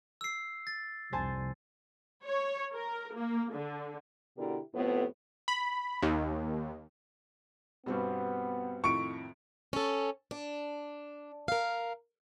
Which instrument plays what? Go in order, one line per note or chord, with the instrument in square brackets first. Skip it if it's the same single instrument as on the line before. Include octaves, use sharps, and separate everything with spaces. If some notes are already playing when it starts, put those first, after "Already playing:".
[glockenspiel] E6 C7
A6
[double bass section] F1 C2 [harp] C5 G#5 A5
[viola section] C#5
A#4
A#3
D3
[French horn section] B2 D3 E4 G4 A#4
F2 A2 C3 B3
[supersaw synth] B5
D#2
[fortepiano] G2 B2 [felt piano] G3 C4 F#4 [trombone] B3
[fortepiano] F2 A2 D#3 [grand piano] C#6 D7
[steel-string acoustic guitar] C#4 A4
D4
A#4 F5